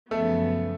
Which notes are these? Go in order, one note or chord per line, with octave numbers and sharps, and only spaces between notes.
F#2 C#3 F3 A3 B3 A4